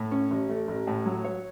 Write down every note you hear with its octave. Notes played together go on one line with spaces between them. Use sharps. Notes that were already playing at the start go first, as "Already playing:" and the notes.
Already playing: A2
C#4
A1
A3
A1
A2
F#3
C#5